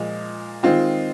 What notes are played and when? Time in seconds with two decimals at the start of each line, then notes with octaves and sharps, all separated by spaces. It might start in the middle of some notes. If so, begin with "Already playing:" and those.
Already playing: A#2 F3 G#3
0.63 D#3 G#3 C4 F4